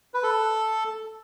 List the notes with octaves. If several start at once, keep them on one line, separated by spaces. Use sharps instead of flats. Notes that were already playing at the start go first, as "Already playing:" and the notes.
B4
A4